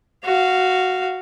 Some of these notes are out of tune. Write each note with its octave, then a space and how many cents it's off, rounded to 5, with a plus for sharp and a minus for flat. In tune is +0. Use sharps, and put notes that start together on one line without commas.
F#4 +0 F5 -10